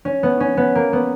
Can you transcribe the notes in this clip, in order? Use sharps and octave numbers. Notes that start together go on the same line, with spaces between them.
C#4
B3
C#4
B3
A#3
B3